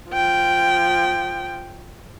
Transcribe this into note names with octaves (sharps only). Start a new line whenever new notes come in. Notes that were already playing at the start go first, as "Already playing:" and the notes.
F3 G5